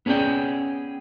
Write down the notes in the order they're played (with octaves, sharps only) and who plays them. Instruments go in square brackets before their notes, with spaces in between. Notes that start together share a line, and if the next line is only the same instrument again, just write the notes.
[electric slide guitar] B3 C#4 G#4 D5 G5